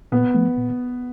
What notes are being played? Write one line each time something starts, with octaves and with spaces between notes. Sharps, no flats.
A#2 B3
F3 A3
A#2